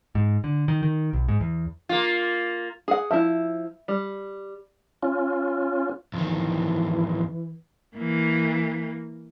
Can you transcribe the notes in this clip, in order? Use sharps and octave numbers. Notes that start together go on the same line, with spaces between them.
G#2
D3
D#3
D#3
B1
G#2
E2
A#3 F4
G#4 F#5
F3 E4 E5
G3
C#4 F4
F2 D#3 E3
E3 A#3